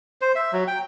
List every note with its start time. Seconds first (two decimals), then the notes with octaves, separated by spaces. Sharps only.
0.21 C5
0.35 E5
0.53 F#3
0.68 G5